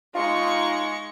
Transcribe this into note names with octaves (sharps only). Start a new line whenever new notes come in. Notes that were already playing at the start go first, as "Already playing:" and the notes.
G#3 D#4 F4 C#6